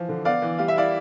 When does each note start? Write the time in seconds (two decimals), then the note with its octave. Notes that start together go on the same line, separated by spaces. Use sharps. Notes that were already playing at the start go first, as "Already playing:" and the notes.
Already playing: E3 F3
0.09 D3
0.25 B3 D5 F5
0.42 E3
0.58 G3 F5
0.68 E5
0.76 E4 D5 F5